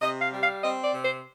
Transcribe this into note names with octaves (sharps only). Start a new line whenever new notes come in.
C3 D#5
F5
G3
F5
C4 D#5
D5
C3
C5